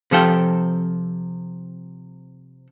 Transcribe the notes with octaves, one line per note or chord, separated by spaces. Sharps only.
C3 F3 A4 G5